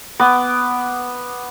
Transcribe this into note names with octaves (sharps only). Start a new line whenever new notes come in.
B3 D6